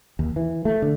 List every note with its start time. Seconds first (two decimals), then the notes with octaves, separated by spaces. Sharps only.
0.19 D#2
0.36 E3
0.65 A3
0.82 D3